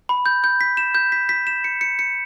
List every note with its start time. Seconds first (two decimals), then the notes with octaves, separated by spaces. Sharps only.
0.09 B5
0.26 G6
0.44 G6
0.61 B6
0.77 E7
0.95 G6
1.12 B6
1.29 B6
1.47 E7
1.64 C#7
1.81 C#7
1.99 C#7